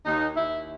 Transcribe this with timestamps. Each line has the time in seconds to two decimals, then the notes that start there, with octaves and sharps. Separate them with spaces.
0.05 D#2 D#4
0.36 D#2 E4